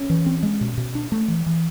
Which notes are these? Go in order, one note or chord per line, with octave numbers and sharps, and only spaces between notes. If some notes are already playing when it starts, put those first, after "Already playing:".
Already playing: C#4
E3
C4
G#3
B2
B2
D4
A3
E3
E3